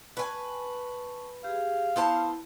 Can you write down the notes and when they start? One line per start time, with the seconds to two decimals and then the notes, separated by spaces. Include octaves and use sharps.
0.17 B4 G#5 A5 C#6
1.44 G4 G#4 F5
1.96 B3 E4 C5 A5